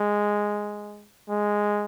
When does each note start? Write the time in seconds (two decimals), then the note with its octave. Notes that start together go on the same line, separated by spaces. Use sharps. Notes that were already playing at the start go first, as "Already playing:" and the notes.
Already playing: G#3
1.30 G#3